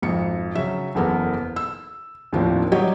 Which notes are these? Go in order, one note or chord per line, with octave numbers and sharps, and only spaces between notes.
G#1 F2 C#7
C#3 F#3 C#4 E5
F#1 E2 B3 A4 A#4
E6
D#2 A2 F3 A#3 C4 D4
F#3 G3 F#4 G4 C#5 D#5